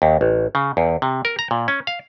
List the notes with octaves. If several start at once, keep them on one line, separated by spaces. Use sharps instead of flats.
D#2
A1
C#3
E2
C3
A#4
A#5
A#2
C#4
F5